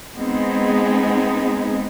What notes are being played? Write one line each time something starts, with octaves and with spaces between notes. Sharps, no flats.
G#3 B3 C4 D#4 G#4